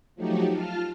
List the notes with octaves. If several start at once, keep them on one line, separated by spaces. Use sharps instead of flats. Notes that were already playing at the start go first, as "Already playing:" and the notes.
F3 F#3 A3 D#4 F#4 G4
F4 A5 F6